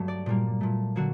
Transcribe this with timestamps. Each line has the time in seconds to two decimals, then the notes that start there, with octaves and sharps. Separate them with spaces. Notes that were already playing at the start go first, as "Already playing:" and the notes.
Already playing: G2 F#3 A3
0.08 D5
0.26 A#2 G3 A#3
0.61 A#2 A3
0.96 D3 F#3 A#3 F#4